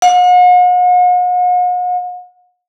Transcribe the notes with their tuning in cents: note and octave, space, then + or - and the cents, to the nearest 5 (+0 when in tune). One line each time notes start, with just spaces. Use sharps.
F#5 -45